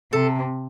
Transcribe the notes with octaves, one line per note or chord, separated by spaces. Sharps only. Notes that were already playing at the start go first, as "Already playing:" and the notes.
C3 A4